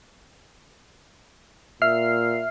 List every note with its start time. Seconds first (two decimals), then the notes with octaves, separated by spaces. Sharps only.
1.82 A#2 E5 F6 C7